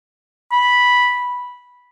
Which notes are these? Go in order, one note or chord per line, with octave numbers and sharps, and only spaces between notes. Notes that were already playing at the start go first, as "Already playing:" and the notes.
B5